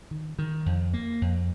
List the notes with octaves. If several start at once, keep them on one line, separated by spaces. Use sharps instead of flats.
D#3
D#3
F2
A#3
F2